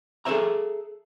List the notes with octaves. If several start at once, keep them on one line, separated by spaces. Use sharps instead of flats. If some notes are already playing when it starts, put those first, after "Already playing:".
G#4 A4 B4 C#5 E5 A#5